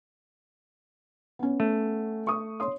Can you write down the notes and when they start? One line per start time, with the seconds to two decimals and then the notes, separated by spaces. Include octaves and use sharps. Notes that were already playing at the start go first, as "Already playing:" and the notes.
1.39 B3 C#4
1.60 A3
2.27 C#6 D#6
2.60 C#5 C6 D#6